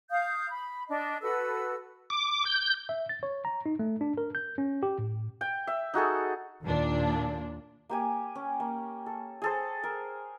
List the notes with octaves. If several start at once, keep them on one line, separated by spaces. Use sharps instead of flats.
F5 D#6 G6
B5
D4 D#5
F#4 A4 B4 E6
D6
G6
E5
A6
C#5
A#5
D#4
A3
D4
A#4
G6
C#4
G4
A2
G5
E5
D#4 F#4 G#4 A4
D#2 A#2 D4
A#3 G4 G#5
C#4
A#3
A4
G#4 A4 C5
A#4